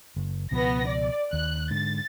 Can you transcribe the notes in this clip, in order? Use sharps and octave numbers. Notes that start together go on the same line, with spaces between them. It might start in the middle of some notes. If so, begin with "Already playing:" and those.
F#1
C#2 B2 F3 B3 A#6
D5
D#2 F#6
G#2 D3 A6